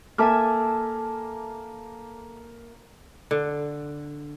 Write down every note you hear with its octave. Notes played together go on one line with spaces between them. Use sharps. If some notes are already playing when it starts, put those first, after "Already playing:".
A#3 A4 E5 G#5 A5 D6 F6
D3